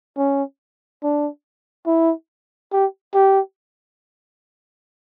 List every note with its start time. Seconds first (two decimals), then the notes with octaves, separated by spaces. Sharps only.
0.18 C#4
1.03 D4
1.87 E4
2.73 G4
3.15 G4